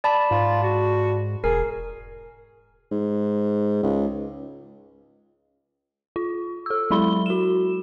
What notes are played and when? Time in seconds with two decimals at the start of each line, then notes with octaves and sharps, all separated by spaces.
0.04 D5 A5 B5
0.31 G#2 F4
0.63 F#4
1.44 E1 G#4 A#4
2.92 G#2
3.83 C#2
6.16 F4
6.66 A4 E6
6.91 F#3 G#3 E4 B5 G7
7.26 F#4 E7